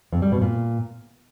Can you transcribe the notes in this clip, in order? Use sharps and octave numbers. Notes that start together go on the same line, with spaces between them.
F2
G3
B2
A#2